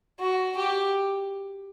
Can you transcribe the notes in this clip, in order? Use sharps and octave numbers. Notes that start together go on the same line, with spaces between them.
F#4
G4